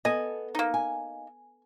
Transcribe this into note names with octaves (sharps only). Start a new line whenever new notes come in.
B3 A4 D#5 G#5
A#3 D#4
G#5